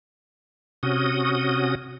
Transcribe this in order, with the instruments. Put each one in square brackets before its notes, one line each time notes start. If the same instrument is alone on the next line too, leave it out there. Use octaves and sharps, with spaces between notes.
[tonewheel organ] C3 C#4 F#4 D#6